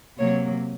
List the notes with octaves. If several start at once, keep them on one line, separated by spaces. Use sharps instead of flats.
C3 F#3 A#3 C#5